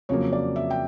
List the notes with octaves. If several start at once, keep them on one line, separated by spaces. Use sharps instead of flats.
F2 C#3 F#3 A#3 C#5
D5
E5
G5